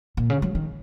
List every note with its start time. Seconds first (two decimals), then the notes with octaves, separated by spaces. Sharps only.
0.17 A#2
0.30 C#3
0.42 F#3
0.55 D#3